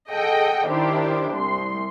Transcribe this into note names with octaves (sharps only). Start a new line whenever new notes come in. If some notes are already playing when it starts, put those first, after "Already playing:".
G#4 A4 D#5 F#5 G5
D#3 D4 E4 G4 C5
C2 C6